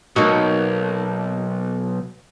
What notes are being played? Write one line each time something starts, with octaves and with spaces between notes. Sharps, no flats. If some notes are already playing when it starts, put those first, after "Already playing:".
B1 A#3 D#4 F#4